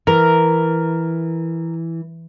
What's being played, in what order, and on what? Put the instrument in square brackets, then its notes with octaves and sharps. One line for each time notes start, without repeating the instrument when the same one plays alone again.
[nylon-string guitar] E3 [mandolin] A#4